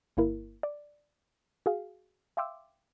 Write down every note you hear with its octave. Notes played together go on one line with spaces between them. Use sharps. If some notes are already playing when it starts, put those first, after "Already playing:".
G1 A#3 E4 A#4
D5
F#4 G#4 F5
E5 F5 G5 C6 D6 E6